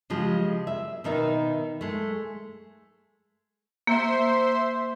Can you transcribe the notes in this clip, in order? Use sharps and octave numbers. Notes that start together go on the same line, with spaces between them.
C#3 F3 G#3 G4
E5
B2 D#3 D#4 E5
G#3 A3
A#3 C5 E5 C6